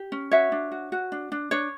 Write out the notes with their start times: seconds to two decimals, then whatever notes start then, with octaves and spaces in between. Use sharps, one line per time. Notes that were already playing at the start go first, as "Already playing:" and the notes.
Already playing: G4
0.12 C#4
0.31 F#4 C#5 E5
0.52 D4
0.72 F#4
0.92 F#4
1.12 D4
1.32 D4
1.51 D4 C#5